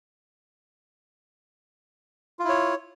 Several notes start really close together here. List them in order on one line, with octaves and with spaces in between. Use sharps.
F4 E4 C#5